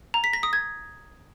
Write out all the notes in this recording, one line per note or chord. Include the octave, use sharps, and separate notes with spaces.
A#5
B6
A#6
D#6
G#6